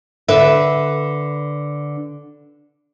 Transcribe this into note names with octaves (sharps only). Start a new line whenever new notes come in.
D3 B4 E5